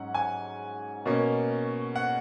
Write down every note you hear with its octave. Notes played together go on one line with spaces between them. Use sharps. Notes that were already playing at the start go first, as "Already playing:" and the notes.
Already playing: G#2 F#3 C#4 F#5
G#5
B2 A#3 C#4
F#5